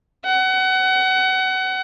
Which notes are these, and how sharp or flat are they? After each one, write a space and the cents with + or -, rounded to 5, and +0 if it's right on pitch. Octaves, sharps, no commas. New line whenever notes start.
F#5 +25